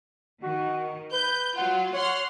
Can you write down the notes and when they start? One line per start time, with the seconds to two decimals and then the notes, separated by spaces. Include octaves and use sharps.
0.43 D#3 F#4
1.12 B4 G6
1.57 F#3 F4 F#5
1.93 C#5 F#5 C6 F6